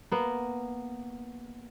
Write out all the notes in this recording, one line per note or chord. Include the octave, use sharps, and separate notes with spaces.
A#3 B3